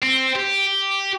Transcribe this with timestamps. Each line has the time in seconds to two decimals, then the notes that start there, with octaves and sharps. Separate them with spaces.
0.02 C4
0.35 G4